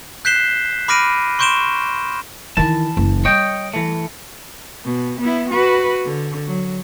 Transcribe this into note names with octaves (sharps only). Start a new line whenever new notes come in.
F#6 G6 B6 C7 E7 G7
B5 D6 F6 A#6 D7 D#7
C6 C#6 G6 D7 E7 G7
D#3 E3 E4 A5
F#1
G3 C#5 D#5 G5
E3 A3
B2
B3 E4
F#4 B4
D3
F#3